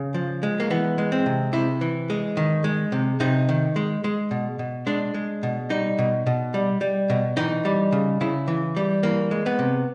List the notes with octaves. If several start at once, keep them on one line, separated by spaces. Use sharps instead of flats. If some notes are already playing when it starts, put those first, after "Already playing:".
Already playing: C#3
F3
G#3
A#3
E3 B3
G#3
C4
C3
C3 E4
E3
G#3
D#3
G#3
C3
C3 D#4
D#3
G#3
G#3
B2
B2
G#3 D4
G#3
B2
G3 D#4
B2
B2
G3
G3
B2
E3 D#4
G3
C#3
C#3 E4
E3
G3
E3 A#3
G#3
B3
C3